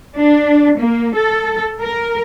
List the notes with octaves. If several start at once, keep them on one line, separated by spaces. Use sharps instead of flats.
D4
A#3
A4
A#4